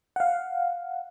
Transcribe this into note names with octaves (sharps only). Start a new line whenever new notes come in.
F5 F#5